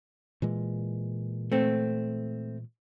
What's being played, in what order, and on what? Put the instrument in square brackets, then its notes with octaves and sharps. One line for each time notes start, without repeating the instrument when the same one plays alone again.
[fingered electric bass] A#2 E3 G#3
[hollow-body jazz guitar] A3 C4